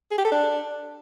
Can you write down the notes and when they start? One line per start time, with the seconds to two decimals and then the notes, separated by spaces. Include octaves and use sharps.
0.11 G#4
0.18 G4
0.25 A4
0.32 D4